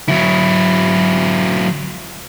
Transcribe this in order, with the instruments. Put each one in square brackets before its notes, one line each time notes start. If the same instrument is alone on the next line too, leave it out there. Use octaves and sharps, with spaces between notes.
[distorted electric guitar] F#3 E4